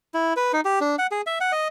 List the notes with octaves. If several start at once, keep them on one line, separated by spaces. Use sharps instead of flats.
E4
B4
D#4
G4
D4
F#5
G#4
E5
F#5
D#5